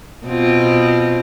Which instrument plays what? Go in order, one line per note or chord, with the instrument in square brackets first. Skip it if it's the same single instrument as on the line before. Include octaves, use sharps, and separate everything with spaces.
[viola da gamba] B2 C4 F4